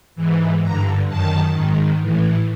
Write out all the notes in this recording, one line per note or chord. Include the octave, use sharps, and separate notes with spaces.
G#2 E3
G2 D3 A#5
F#2 D#3 A5
G#2 D#3
A2 E3